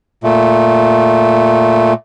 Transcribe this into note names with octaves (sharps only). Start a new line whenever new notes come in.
A#2 A3